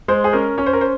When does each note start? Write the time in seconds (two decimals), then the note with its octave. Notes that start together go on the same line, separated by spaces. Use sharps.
0.08 G#3 C5
0.24 G#4
0.33 C#4 A#4
0.58 C#4 C#5
0.66 C5
0.73 A#4
0.81 C5